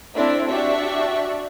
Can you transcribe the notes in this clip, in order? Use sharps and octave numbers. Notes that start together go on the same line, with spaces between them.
A3 C4 D4 E4 E5
D4 F#4 G4 D5 E5 C#6